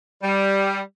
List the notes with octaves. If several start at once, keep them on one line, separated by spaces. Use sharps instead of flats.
G3